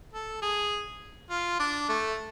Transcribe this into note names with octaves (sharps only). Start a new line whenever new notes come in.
A4
G#4
F4
D4
A3